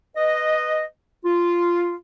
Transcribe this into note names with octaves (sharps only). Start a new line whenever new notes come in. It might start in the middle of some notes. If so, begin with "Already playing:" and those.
B4 D#5
F4